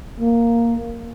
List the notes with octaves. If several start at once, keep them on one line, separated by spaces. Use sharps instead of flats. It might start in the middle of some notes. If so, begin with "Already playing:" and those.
A#3